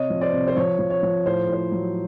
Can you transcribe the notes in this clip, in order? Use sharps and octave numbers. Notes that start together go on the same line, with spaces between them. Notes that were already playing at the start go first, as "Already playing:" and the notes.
Already playing: C3 C#5 D#5
F3
C5 D5
C3
C5
F3 C#5
F3
C#5
F3
A2 C5
A2 C5
F#3